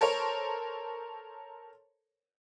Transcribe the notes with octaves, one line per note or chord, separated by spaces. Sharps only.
A4 A#4 C5 C#5